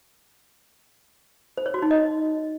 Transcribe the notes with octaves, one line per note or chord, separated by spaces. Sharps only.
C5
C#5
F#4
D#4
D#5